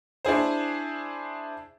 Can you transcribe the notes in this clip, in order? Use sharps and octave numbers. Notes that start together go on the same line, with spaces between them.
D4 E4 G#4 C5